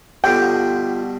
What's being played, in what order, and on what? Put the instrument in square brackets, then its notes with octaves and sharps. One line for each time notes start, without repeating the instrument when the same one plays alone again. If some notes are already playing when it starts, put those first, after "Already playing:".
[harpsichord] G2 B2 D3 [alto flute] F4 [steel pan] G5